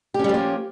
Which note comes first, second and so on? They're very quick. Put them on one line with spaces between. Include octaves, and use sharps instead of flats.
G4 C#4 G3 F3 A#3